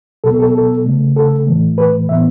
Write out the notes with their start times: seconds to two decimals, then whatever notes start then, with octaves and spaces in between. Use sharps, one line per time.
0.24 B2 F#3 B3 A4
0.39 A4
0.55 A4
0.86 C#3 A3
1.16 A4
1.47 A2 E3 A3
1.78 B4
2.09 A2 E3 B3 E5